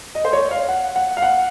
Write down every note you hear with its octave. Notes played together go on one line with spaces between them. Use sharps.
D#5
C5
C#5
F5
F#5
F#5
F5
F#5